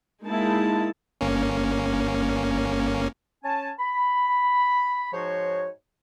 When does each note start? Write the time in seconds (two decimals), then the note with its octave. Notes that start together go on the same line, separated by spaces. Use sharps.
0.23 G#3 A#3 D#4 E4 A5
1.21 G1 A#3 C#4
3.43 C#4 G#5 A5
3.79 B5
5.13 G#2 F3 D#4 F#4 C5 C#5